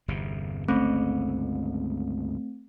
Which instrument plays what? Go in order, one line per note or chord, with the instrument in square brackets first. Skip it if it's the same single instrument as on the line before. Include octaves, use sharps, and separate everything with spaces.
[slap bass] G1 E2 C3
[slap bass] G1 C#2 C#4 [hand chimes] A3 C4